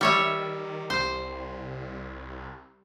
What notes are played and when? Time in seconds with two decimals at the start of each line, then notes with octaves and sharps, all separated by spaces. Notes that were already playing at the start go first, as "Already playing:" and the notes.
0.01 D#3 G3 C#5 E5
0.90 C2 C5